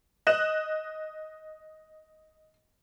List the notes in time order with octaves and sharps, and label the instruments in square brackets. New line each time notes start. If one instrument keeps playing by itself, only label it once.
[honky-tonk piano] D#5 F#6 E7